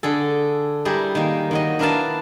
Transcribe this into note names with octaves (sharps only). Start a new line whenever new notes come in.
D3 G#4 A4
G3 E4 G4 G#4 A#4
D#3 A#3
D#3 F#3 D#5
D4 E4 A#4 B4 F5 A5